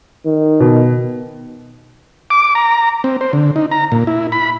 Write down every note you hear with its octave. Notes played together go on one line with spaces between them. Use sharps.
D#3
B2
D6
A#5
C4
C5
D3
D#4
A#5
A#2
E4
B5